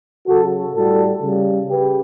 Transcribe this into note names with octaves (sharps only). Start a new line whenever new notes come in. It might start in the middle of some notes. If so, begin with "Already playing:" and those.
C#3 F#3 F#4 A4
A2 G3 F#4 A4
C#3 G3
C#3 G4 B4